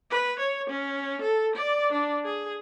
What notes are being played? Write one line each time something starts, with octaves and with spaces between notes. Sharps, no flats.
B4
C#5
C#4
A4
D5
D4
G#4